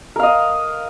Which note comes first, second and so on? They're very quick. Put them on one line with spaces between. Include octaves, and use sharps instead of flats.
A#4 F5 D#5